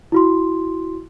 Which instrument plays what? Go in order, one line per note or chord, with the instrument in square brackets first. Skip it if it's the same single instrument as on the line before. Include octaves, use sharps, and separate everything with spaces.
[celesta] E4 F#4 C6